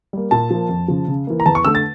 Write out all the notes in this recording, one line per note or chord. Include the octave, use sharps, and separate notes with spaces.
G3 A#3
A#2 A5
F3 A#3
F2
C#3 F3
C#3
E3 A#3
A#5
E2 A5
C#6
D3 A3 E6
A6